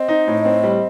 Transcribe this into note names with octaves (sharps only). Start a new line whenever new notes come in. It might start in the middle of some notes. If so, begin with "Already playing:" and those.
Already playing: C4 D#5
D#4
A2
C4
G3